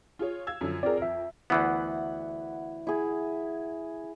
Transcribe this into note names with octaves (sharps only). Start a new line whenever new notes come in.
F4 G#4 C#5
F5 E6 G#6
F#2 D3 F3
C4 F4 G#4 A#4 D5
F2 E5
D2 E3 B3 E4 F#5
E4 G#4